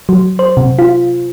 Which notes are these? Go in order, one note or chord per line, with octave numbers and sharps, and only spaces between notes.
F#3
C5
C3
F4